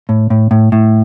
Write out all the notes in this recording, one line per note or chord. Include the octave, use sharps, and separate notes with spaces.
A2
A2
A2
A2